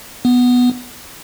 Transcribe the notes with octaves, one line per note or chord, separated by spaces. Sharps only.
B3